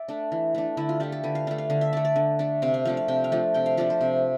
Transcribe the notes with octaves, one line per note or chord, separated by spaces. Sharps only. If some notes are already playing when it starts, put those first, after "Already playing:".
Already playing: D5 E5
A3 D4
E3
A3 D4
D3 E4
F4
A3 D4 G4
A4
D3 B4
F5
A3 D4 F5
F5
D3 F5
E5
A3 D4 D5
D5
D3
A3 D4
C3 F5
F5
F3 A3 D4 F5
F5
C3 G5
F5
F3 A3 D4
C3 G5
F5
F3 A3 D4 D5
C5
C3